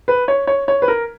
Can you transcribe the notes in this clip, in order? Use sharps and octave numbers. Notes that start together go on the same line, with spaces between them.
B4
C#5
C#5
C#5
B4
A#4